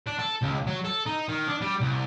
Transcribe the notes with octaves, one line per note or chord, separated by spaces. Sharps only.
D4
A4
C#2
F#3
A4
D#4
D#3
D4
G3
C2